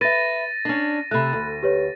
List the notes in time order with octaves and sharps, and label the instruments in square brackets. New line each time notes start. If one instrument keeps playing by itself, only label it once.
[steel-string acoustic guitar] B4 E5 [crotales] A6 A#6 D#7
[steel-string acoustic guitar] C#4 D4
[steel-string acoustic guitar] C3 A3 [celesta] B5 F#6
[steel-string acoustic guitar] D2
[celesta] G4 B4 C#5